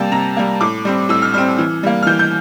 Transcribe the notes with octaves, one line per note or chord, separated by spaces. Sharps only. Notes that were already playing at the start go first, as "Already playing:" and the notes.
Already playing: C3 G3 A#3 G5 A5
C3 A#5
G3 A#3
A2 D6
G3 C4
A2 E6
F6
G3 C4 F6
E3
G3 A#3
F6
E3 G6
G6